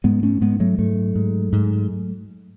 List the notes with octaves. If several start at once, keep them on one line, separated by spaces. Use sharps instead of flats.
G#2 G#3 B3
A3 C#4
G#2 G#3 B3
F#3 A3
G#2 F#3 A3
G#2
G#2